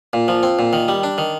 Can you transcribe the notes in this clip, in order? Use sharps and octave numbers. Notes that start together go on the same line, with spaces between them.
A#2
F3
C4
A#2
D#3
G3
D4
D#3